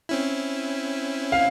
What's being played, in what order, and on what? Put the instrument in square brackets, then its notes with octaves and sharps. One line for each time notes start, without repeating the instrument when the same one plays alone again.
[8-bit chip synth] C4 C#4 E4
[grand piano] F5